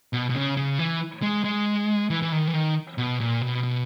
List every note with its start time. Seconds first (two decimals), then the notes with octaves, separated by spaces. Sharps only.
0.13 B2
0.30 B2
0.35 C#3
0.57 C#3
0.79 E3
1.22 G#3
1.45 G#3
2.10 E3
2.22 E3
2.32 D#3
2.48 E3
2.54 D#3
2.98 B2
3.20 A#2
3.41 B2
3.63 B2